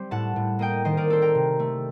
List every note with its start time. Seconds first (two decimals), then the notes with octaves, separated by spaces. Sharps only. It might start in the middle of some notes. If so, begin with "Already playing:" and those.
Already playing: G3 C4 C5
0.11 A2 F#5 A5
0.36 A2
0.59 A#3 D#5 G5
0.85 D#3 C5 D#5
0.97 A#4 D5
1.08 C4 A4 C5
1.22 G5 A#5
1.35 C3
1.59 A3